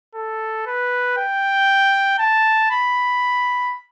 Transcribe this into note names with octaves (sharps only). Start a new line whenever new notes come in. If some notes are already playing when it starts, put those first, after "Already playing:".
A4
B4
G5
A5
B5